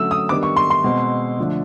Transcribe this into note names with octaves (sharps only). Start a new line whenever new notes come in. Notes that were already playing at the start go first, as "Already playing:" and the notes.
Already playing: D3 F#3 A3 C#4 E6
D#6
D#3 G3 B3 D4 D6
C#6
C6
C6
B2 G#3 C4
D3 F3 A3 D4